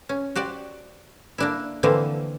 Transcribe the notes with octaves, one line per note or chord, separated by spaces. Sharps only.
C#4
F#4 G4 C5 D5
A#3 D4 E4
D3 E3 F3 A3 A#3 C4